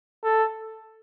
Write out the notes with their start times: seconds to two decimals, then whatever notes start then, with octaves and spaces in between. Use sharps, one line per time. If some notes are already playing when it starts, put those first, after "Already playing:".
0.24 A4